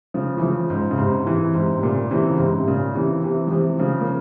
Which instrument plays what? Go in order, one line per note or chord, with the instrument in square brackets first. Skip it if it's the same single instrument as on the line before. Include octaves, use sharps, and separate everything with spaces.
[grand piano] C#3 F3
E3
C#3 F3
G#2
C#3
G#2 C3
C3 E3
G#2 C3
C3
A#2 C#3
C3 E3
C#3
G#2 C3
C3
A#2 C#3
C3 E3
C3 E3
F3
C3 E3
C#3 F3
A#3